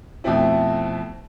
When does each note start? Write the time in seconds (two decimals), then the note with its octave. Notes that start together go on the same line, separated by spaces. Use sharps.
0.24 F2 B2 A3 C4 E4